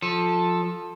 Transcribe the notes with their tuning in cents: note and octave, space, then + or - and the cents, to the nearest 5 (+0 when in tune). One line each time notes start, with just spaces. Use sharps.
F3 +15 A4 +0